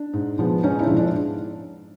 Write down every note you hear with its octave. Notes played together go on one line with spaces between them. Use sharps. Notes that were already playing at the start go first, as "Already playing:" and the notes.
Already playing: D4
G#2
F3 G#3 B3
G#2 C#4 D#4
D4 E4
F3 G#3 B3
D4
G#2